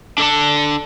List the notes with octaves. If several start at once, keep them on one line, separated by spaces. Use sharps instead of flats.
D4 A4 D5 A5